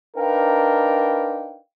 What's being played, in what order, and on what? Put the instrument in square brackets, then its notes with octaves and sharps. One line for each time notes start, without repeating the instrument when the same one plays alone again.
[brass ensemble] D4 D#4 A#4 B4 F5 G5